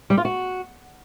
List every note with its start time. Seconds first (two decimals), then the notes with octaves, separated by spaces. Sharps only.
0.10 G3
0.17 F4
0.25 F#4